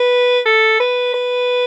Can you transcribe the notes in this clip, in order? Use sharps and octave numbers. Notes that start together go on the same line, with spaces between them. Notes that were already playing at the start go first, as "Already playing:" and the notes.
Already playing: B4
A4
B4
B4